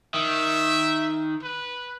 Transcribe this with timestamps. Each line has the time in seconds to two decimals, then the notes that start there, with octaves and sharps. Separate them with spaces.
0.14 D#3 E5
1.43 B4